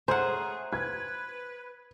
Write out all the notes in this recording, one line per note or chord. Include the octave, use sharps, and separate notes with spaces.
A3 C#4 G#4 C5 F#5 A#5
B4 G#6